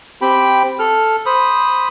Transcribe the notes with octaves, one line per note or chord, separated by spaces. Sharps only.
C4 G4 G5 B5
A4 F6
C5 B5 D#6